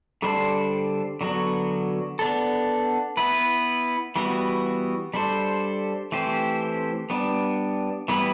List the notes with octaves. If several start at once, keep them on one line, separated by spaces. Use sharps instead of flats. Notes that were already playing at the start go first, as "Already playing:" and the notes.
D3 G3 D4 A4 C5
D3 F#3 B3 F#4
B3 D4 A4
B3 E4 B4
E3 G3 B3 F#4
G3 D4 A4 C5
E3 A3 C4 G4 C5
G3 B3 D4
E3 G3 B3 E4 B4